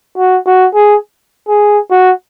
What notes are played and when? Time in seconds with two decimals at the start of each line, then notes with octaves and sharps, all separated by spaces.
0.18 F#4
0.46 F#4
0.74 G#4
1.48 G#4
1.91 F#4